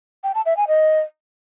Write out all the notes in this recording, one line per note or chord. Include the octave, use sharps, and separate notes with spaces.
G5
A5
E5
G#5
D#5